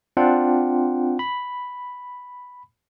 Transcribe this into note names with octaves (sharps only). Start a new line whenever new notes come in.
C4 D4 F4 F#5 G5
B5